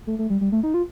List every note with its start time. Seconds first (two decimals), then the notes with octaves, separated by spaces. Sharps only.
0.07 A3
0.19 A3
0.30 G3
0.41 G3
0.52 A3
0.63 D#4
0.74 F4